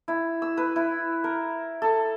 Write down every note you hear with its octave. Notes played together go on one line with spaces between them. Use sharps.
E4
E6
B4
E4
A#4
A4